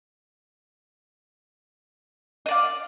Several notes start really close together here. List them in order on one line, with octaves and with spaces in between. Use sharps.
D#5 D5 F5